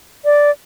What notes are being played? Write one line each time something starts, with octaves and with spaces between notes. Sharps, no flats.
D5